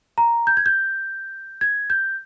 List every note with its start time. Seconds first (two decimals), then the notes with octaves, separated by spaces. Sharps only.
0.18 A#5
0.47 G6
0.57 G#6
0.66 G6
1.61 G#6
1.90 G6